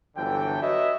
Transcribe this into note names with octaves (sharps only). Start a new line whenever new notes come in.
G1 D3 E3 F#3 A4 G5
F#4 B4 C#5 D#5 E5